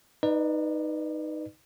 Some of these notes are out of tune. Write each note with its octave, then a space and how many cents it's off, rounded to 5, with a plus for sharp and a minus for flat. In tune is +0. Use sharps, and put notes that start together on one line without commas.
D#4 +0 B4 -5 D5 +35